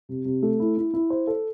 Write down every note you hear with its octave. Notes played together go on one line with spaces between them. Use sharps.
C3
C3
A3
E4
E4
E4
C5
A4